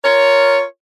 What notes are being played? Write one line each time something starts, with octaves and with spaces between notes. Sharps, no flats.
F4 A#4 C#5